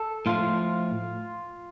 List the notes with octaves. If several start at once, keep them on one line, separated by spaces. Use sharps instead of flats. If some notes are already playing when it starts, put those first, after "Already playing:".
Already playing: A4
A2 F3 F4